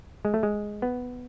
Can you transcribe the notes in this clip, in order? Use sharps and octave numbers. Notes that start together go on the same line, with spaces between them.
G#3
A3
G#3
B3